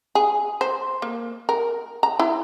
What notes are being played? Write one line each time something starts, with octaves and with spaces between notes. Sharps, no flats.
G#4
C5
A#3
A#4
A#5
E4